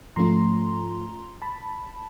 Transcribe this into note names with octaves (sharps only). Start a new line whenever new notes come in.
G#2 F3 A3 C#4 F4 A#5 C6
A5 B5